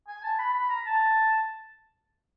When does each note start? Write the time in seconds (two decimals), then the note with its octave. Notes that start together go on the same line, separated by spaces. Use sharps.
0.08 G#5
0.24 A5
0.39 B5
0.54 B5
0.70 A#5
0.86 A5